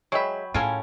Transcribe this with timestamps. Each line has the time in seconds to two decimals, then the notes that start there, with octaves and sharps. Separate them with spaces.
0.12 F#3 G#3 C#5 E5 G5 B5
0.54 A2 C#4 F4 A4 A#4 G#5